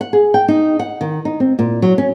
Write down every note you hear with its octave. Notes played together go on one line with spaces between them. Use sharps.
F#5
G#4
G5
D#4
F#5
D#3
D#4
C4
A#2
F#3
C#4